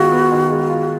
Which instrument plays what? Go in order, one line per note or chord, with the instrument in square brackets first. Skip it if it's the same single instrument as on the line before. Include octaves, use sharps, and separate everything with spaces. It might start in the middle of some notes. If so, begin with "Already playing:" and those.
Already playing: [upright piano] D#3 G#3 B3 F4 [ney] F#4
[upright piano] B3
D#3
G#3
F4